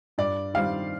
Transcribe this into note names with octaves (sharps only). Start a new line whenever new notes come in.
G2 D5
D#3 G3 C4 F5